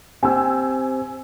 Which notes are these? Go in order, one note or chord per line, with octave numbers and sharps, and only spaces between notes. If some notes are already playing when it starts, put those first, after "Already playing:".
C4 G4 C5 G#5 E6